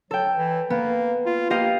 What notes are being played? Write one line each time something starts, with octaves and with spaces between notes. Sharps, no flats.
F#3 A4 G5
E3
A#3 B3
F4
A#3 G4 D#5 F5